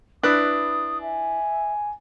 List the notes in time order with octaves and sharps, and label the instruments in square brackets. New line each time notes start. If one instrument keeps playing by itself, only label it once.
[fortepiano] D4 F#6 [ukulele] E4 B4 [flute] D#6
[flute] E5 [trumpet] G#5